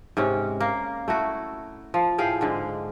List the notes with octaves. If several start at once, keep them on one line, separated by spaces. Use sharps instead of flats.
G#2 C3 C#4
A#3
A3 E4 F#4
F3
A2 G#4 F5 G5
G#2 D3 G#3